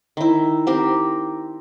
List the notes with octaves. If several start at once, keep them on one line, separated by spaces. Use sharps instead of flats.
D#3 E4
C4 G4 A#4